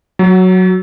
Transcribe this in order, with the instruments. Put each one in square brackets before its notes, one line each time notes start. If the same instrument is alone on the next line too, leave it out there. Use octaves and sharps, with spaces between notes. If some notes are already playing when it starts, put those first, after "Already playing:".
[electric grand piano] F#3